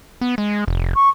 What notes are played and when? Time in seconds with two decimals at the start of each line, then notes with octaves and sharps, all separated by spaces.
0.21 B3
0.38 G#3
0.68 F1
0.95 C#6